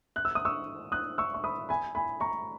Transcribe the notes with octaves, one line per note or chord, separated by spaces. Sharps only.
F#6
E6
D#6
C#6 E6
D#6 F#6
C#6 E6
C#6
B5 D#6
G#5 B5
G#5 B5
A#5 C#6